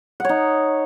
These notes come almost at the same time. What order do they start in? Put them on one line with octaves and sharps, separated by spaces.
F#5 C#5 D#4